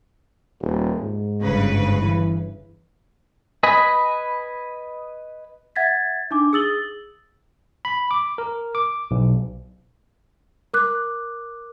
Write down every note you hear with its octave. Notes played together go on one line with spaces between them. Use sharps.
D#1
G#2
G1 C#3 B4
E3
B4 D#5 G#5 B5
E5 F#5 G#6 A6 B6
D4 D#4 D6
G#4 D#6 E6 A6 F#7 G7
B5
D6
A#4
D6
B1
A#4 D6 F#6